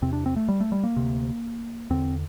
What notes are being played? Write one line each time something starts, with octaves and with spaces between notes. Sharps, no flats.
E2 C3 C4
D4
C4
A3
G3
A3
G3
A#3
D2 C3
E2 D3 C4